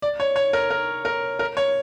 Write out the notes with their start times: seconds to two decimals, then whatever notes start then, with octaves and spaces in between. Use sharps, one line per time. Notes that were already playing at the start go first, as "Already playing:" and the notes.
0.02 D5
0.20 C#5
0.36 C#5
0.53 A#4
0.70 A#4
1.05 A#4
1.39 A#4
1.57 C#5